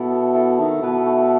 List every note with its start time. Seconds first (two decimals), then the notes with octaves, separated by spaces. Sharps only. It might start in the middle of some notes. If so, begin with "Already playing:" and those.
Already playing: B2 E4 A4
0.11 B3
0.34 E4 A4
0.58 D#3 A3
0.82 B2 E4 B4
1.06 A3